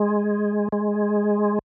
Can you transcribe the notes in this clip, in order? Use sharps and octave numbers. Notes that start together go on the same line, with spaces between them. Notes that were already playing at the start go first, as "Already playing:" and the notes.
Already playing: G#3
G#3